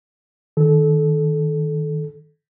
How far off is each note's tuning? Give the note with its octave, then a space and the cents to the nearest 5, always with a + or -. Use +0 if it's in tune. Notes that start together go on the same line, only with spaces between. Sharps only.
D#3 +0 A4 -25